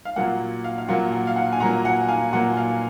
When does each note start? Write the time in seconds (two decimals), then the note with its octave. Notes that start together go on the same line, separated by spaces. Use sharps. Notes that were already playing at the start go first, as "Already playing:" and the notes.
0.05 F5
0.16 A#2 F#3 A#3 F#5
0.64 F5
0.78 F5
0.88 A#2 F#3 A#3 F#5
1.12 F#5
1.27 F5
1.36 F#5
1.52 G#5
1.60 A#2 F#3 A#3 F#5 A#5
1.85 F#5
2.08 F5 G#5
2.33 A#2 F#3 A#3 F#5
2.57 F5